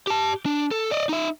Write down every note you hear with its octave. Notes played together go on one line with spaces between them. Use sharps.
G4 A5
D4
A4
D5 D#5
D#4 E5